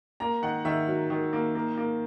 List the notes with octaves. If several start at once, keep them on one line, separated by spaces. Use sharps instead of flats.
A#3 A#5
D#3 F#5
D#3 E5
F#3
D#3
A#3
A#3
A#3